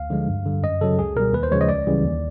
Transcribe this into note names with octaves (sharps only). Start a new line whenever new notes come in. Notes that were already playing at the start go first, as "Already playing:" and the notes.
Already playing: D2 F5
D3 F3 G#3
G2
D3 G3
F#2 D#5
C#3 F#3 A4
C#2 G#4
B2 G3 A#4
D#2 B4
C5
C#3 F3 G#3 C#5
D#5
C#2 D5
C#3 E3 G3
D#2